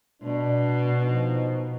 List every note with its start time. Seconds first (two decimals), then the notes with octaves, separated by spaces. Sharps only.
0.23 B2 D4
1.07 F3 D#4